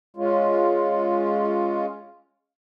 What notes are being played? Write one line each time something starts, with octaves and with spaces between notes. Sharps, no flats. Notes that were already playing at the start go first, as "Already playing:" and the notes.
G#3 C#4 F4